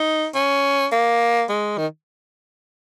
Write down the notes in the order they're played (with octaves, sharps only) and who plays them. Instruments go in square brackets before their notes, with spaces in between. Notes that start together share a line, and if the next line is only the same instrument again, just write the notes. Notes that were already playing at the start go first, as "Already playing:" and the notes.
Already playing: [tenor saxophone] D#4
C#4
A#3
G#3
D#3